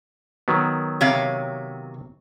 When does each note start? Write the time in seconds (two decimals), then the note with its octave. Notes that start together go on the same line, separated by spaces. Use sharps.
0.48 D#3 F#3 B3
1.01 C3 C#5 F5